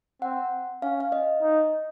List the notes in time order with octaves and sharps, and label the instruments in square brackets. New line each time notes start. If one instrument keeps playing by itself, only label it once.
[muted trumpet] C4 [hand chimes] F#5
[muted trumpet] C#4 [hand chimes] F5
[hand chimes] F5
D#5
[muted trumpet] D#4